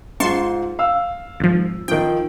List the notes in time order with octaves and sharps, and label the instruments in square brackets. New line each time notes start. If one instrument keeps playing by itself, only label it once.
[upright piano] G#2 F4 [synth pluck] A5 C6 C#6
[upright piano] F5 E6
[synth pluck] G#1 F3
[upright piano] D#3 F3 [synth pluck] G5